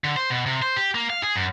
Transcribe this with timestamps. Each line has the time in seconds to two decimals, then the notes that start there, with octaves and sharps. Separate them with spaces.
0.04 D3
0.16 C5
0.30 B2
0.46 C3
0.62 C5
0.76 G4
0.95 A#3
1.10 F5
1.23 G#4
1.36 F#2